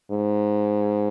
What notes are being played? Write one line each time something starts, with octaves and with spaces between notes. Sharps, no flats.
G#2